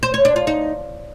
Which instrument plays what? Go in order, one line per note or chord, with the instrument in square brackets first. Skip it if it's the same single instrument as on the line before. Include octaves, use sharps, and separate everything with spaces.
[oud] C5
C#5
D4
F4
D#4